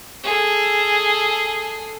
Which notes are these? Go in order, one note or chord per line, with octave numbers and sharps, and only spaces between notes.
G#4 A4